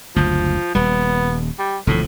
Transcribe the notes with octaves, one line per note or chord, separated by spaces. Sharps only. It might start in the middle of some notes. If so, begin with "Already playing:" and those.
F#1 D2 F3
D#1 G3 B3
G3
E1 D2 A2 F3